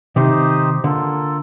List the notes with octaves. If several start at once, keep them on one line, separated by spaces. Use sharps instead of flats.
C3 D#3 D#4 G4 C5 D#5
D3 A#3 F4 A4